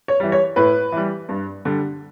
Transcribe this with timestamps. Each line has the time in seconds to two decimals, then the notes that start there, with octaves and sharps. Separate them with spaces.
0.08 C#5
0.20 E3 G3
0.32 C#5
0.56 A2 B4
0.92 E3 G3
1.29 G2
1.65 D3 G3